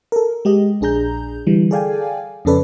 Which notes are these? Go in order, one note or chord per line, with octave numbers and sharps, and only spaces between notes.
A4 A#4
G#3 G4 D#5
A#1 D4 G#4 A#5 G6
D3 E3 G3
G#4 A4 D5 F5 G5 G#5
F2 C#3 C#4 A4 B4 D5